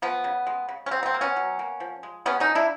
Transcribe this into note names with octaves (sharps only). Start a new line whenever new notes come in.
F3 B3
C#3
G#3
C#3
C#4
F#3 C4
B3
C4
A#3
B3 C#4
F#3
A#3
F3
G#3
C3 B3 C#4
C#4 D#4
F3
D4 E4